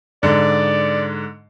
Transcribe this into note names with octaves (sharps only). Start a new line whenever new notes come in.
G#2 D3 D5